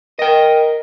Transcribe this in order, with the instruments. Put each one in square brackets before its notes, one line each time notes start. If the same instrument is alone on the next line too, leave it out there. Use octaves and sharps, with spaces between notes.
[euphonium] A#4 [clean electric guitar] D#5 G5